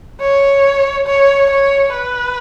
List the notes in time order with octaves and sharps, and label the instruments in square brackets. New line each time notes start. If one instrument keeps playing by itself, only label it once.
[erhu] C#5
C#5
C#5
B4